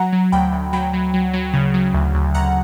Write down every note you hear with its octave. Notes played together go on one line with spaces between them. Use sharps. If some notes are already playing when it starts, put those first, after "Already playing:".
Already playing: F#3 F#5 A#5
F#3
D2 G5 B5
D2
F#3 G5 B5
F#3
F#3
F#3
C#3
F#3
D2
D2
D2 F#5 A#5